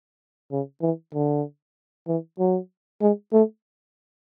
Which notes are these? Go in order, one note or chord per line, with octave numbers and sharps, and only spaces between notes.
C#3
E3
D3
E3
F#3
G#3
A3